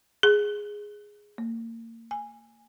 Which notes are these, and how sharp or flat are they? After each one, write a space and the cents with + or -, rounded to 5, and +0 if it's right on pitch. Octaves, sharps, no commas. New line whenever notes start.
G#4 -5
A#3 -35
G#5 -10